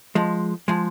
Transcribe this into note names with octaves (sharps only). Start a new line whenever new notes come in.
F3 G#3
F3 G#3